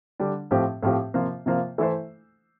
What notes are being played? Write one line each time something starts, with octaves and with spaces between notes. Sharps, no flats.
D3 G3 D4
A2 F3 C4 G4
A2 F3 C4 G4
C3 F3 A#3 F4 C5
C3 F3 A#3 F4 C5
E3 A3 E4 A4 C5